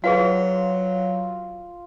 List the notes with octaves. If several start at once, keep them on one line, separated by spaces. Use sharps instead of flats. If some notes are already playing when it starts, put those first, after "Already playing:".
F#3 F4 G#4 B4 F#5